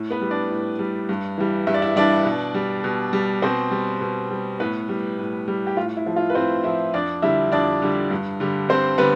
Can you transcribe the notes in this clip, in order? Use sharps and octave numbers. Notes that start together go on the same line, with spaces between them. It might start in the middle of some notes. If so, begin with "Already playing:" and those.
Already playing: A2
B3 B4
G3
D4 D5
A2
G3
G2
E3 G3
G2 E5
D5
E4 E5
E3 G3 D4 D5
B2
G3
B2
G3
B2 C4 C5
G3
B2
G3
A2 B3 B4
G3
A2
G3
G4
A2 F4
E4
F3
F4
B4
A2 C4 C5
F3 E4 E5
F2 D4 D5
D3 G3 E4 E5
F2 D4 D5
D3 G3
G2
D3 G3
G2 C4 C5
D3 G3 B3 B4